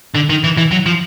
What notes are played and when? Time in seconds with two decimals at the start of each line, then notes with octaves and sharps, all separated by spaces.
0.15 D3
0.29 D#3
0.44 E3
0.57 E3
0.72 F#3
0.86 F3